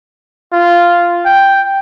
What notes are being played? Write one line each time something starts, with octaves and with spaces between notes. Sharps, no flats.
F4
G5